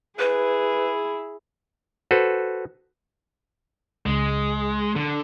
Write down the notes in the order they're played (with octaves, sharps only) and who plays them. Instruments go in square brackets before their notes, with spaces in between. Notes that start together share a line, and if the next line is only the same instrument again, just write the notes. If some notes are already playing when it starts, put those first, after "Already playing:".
[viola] E4 G#4 [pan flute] B4
[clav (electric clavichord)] F#4 A4 B4 C5
[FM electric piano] C#2 C#3 [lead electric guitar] G#3
[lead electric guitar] D3